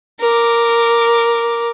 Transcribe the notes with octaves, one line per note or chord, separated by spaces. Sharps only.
A#4 D6